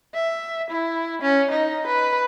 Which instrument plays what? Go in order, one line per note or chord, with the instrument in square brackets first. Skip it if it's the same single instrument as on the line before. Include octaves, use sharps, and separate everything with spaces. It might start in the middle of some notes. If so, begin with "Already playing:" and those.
[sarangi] E5
E4
C#4
D#4
B4